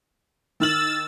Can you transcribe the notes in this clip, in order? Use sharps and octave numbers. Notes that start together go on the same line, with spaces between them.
D#3 E6 F6 A6 F#7